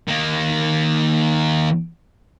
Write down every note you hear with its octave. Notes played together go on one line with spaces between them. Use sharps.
D#3 A#3